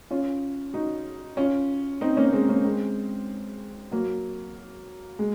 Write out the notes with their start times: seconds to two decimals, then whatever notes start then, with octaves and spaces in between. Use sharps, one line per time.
0.11 C#4 F4
0.73 D#4 F#4
1.37 C#4 F4
2.01 C4 D#4
2.17 A#3 C#4
2.33 G#3 C4
2.49 A#3 C#4
2.64 G#3 C4
3.91 F#3 A#3
5.19 G#3